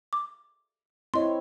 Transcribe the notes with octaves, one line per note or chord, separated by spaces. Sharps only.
D6
C4 E4 C#5 D#5 C6